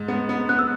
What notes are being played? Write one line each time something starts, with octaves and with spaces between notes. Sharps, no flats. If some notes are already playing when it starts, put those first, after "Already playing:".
Already playing: G#2
B3
B3
B3 F#6
E6